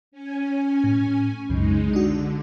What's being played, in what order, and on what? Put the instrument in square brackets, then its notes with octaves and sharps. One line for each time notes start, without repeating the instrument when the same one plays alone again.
[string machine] C#4 G#5
[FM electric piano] A2
[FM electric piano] C2 F#2 C#3 [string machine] G#3 D#4
[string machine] D3 [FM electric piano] D4 F#4